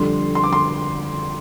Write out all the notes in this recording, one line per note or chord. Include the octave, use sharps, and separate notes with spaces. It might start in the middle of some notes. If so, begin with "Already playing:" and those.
Already playing: F2 D3 G3 C6
C6
D6
C6